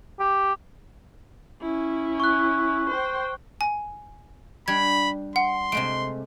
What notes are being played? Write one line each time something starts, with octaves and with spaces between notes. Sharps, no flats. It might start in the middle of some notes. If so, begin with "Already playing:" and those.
G4
C#4 E4
C#6 F#6
C5 G5
G#5
G3 D4 B5 G#6
F#5 C6
C3 G#3 A3 D7